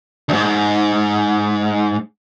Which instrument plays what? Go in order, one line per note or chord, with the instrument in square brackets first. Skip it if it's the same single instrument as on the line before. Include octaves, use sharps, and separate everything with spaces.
[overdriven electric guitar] D2 G#2